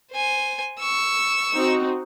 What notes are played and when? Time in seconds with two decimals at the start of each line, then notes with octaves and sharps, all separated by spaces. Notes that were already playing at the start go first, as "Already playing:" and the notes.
0.12 C5 G#5
0.80 C#6 E6
1.53 C4 D#4 F#4